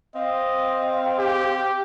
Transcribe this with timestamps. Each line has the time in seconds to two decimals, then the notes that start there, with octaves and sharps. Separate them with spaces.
0.15 C4 D#5 F5
1.19 G4